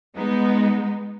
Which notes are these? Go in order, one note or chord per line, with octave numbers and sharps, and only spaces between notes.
G#3 B3 D#4